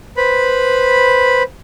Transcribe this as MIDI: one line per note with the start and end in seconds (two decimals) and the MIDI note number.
0.17 1.43 71
0.17 1.43 72
0.17 1.43 83